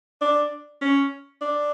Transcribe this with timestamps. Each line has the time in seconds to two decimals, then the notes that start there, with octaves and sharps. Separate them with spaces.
0.22 D4
0.81 C#4
1.41 D4